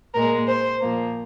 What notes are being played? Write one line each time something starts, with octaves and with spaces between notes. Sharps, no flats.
A#2 G#3 A#4
C5
A#2 F3 A#3